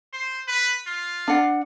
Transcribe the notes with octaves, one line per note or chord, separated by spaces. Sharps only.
C5
B4
F4
D4 F#5